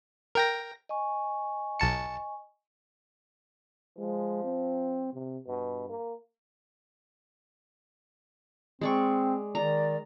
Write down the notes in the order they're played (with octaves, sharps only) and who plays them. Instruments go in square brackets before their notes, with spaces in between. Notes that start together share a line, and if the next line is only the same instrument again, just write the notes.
[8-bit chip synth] A#4 G5 A#6
[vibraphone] D#5 G#5 C#6
[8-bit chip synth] B1 A5 C#7
[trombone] F3 [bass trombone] G#3
[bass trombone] C4
C3
[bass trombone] G2 [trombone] B2
[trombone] A#3
[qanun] G#3 D5 C#6 [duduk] C4
[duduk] D#3 [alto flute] D5 [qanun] A#5